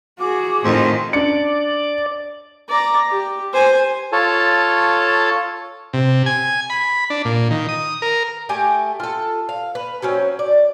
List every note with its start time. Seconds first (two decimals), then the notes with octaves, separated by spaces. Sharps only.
0.20 F#4 G#4 D6
0.64 F2 A2 D#3 C6
1.13 D4 D5 C#7
2.69 D5 A#5
3.10 G4
3.53 C5 G#5
4.12 F4 A4 C#5 A5
5.93 C3
6.26 G#5
6.70 B5
7.10 D4
7.25 A#2
7.51 D#3
7.69 D#6
8.02 A#4
8.49 A3 G4 G5 G#5
9.00 F4 A4
9.49 F5
9.75 B4
10.02 F#3 C4 C#4
10.39 D5